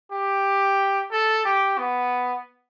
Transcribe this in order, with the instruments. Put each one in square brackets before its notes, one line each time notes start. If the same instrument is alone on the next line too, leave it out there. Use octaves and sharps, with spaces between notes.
[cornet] G4
A4
G4
B3